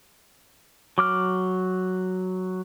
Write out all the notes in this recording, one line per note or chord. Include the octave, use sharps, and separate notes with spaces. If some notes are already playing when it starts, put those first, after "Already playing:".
F#3 D6 F6